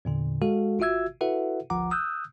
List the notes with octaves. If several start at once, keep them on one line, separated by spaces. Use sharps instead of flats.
E2 A#2 D3
G#3 F#4 A4 F5
G#1 F4 F#4 E5 E6 G#6
E4 F#4 A4 B4 E5 F#5
G1 C#2 F3 F#5 A#5 D6
D#6 E6 F#6 G6